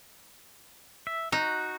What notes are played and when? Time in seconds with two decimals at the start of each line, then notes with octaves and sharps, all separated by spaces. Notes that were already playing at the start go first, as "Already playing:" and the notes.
1.07 E5
1.32 D#4 F#4